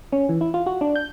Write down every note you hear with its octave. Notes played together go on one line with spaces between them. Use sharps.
C#4
E3
E4
F4
F#4
D4
G6